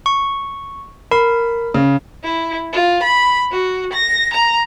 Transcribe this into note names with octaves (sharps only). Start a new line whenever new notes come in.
C#6
A#4 B5
C#3
E4
F4
B5
F#4
A#6
A#5